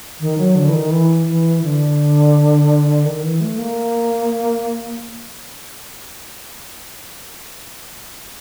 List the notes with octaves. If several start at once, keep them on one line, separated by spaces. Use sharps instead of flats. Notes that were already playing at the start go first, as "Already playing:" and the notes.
D#3
F#3
D3
E3
D#3
E3
E3
D3
D#3
E3
A3
A#3